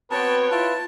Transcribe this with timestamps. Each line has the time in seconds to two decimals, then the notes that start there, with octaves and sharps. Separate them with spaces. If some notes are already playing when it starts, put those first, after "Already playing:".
0.11 B3 C4 F#4 B4 C#5 G5 A5
0.51 E4 F4 A5